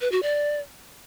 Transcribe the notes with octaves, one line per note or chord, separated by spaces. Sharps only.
B4
F#4
D5